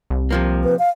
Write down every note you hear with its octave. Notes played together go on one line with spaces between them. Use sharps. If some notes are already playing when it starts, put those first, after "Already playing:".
C2
C3 F3 A#3
B4
F5